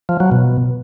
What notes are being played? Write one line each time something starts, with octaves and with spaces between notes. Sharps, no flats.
F3
F#3
B2